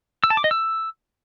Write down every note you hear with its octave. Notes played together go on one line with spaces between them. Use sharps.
E6
A5
D6
D#5
E6